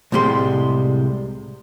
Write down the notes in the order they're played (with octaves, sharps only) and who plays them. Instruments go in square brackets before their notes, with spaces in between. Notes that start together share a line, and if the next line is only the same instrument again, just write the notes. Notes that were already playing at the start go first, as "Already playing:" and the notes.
[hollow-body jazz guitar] C2 A2 C3 G3 G#3 C6